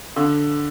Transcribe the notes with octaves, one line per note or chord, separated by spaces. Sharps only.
D3